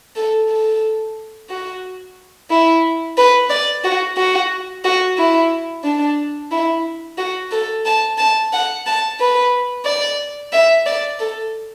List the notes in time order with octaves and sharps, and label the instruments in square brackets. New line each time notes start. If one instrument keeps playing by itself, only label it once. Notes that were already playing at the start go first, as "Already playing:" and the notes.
[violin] A4
A4
F#4
E4
B4
D5
F#4
F#4
F#4
E4
D4
E4
F#4
A4
A5
A5
F#5
A5
B4
D5
E5
D5
A4